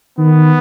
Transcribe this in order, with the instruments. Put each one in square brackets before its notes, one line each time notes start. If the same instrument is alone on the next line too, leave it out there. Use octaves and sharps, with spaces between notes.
[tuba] D#3 [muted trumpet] B3